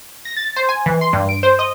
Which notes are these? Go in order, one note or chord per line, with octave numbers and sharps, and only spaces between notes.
A#6
A6
C5
G#5
E3
C6
G2
D7
C5
D#5